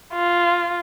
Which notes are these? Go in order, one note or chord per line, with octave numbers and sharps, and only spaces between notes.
F4